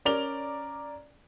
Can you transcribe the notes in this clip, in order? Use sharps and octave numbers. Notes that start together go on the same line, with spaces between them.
C#4 A#4 D5 F7 G7